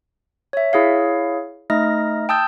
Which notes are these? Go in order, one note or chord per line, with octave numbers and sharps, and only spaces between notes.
C#5 E5
E4 G#4 C#5 F5
A3 D#4 D#5 F6 A#6
G5 A5 D#6 E6 G6